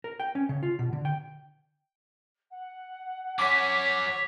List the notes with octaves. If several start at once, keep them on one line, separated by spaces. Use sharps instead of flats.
A#4
G5
C#4
C#3
F4
B2
D3
G5
F#5
F#3 C#4 C#5 D6 B6